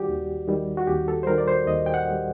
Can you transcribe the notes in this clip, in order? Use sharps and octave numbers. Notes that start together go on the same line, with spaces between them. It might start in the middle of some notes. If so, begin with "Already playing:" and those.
Already playing: D#3 G3 F#4 G4 D5
D#2
D#3 G3
F#4
D#2 G4
A4
C5
D#3 G3 A#4
D5
C5
D#2 D#5
G5
F#5
D#3 G3